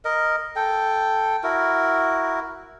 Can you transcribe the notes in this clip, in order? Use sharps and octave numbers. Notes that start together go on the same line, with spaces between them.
A#4 D#5
A4 G5
E4 F#4 A#4